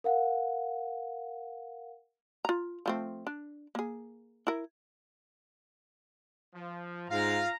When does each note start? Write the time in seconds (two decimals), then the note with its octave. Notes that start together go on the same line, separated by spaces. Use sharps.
0.04 A#4 F5 F#5
2.45 F4 A#5
2.86 F3 A3 C4
3.27 D4
3.75 A#3 G#4
4.47 E4 A#4
6.55 F3
7.10 G#2 F4 F5 A#5 A#6